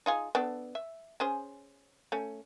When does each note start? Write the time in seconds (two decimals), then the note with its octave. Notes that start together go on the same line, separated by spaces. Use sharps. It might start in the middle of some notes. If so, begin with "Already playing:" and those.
0.06 D#4 F4 G#4
0.35 B3 D4 A4
0.75 E5
1.20 C#4 G#4 C5
2.12 A3 C#4